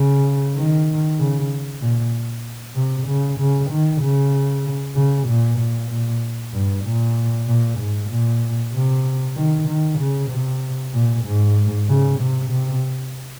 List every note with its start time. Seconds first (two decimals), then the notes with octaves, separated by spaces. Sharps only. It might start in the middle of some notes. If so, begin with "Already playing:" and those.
Already playing: C#3
0.55 D#3
1.18 C#3
1.81 A#2
2.75 C3
3.07 C#3
3.38 C#3
3.70 D#3
4.01 C#3
4.96 C#3
5.28 A#2
5.58 A#2
5.90 A#2
6.53 G2
6.85 A#2
7.47 A#2
7.79 G#2
8.10 A#2
8.73 C3
9.36 D#3
9.68 D#3
9.99 C#3
10.30 C3
10.94 A#2
11.25 G#2
11.88 C#3
12.19 C3
12.50 C3